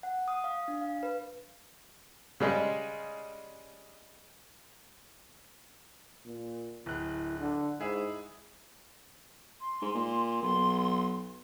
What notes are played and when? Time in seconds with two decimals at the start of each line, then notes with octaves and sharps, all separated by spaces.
0.03 F#5
0.28 D#6
0.44 F5
0.68 D4
0.81 F5
1.03 B4
2.40 C#3 G3 G#3
6.26 A#2
6.86 D1 E4 F#6
7.40 D3
7.80 G#2 E4 G#4 E5
9.61 C6
9.81 G#2
9.95 A#2
10.42 B1 C6